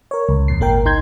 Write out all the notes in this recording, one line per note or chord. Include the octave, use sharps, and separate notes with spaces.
A#4 C#5
C#2
E2 A#2 C7
G#1 A#3 A#4 G5
C#2 D#4 A#5 C6 G6 G#6